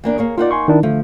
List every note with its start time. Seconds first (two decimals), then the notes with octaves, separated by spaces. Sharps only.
0.04 E2 A#3 D4
0.18 A#3 G#4 C#5
0.38 A#3 D#4 F4 D5 F#5
0.51 G#5 C6 C#6
0.68 D#3 D4 E4
0.83 D3 F3 A3